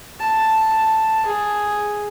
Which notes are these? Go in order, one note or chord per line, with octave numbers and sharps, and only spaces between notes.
A5
G#4